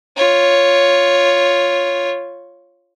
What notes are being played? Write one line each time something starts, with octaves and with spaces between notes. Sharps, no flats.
F4 C#5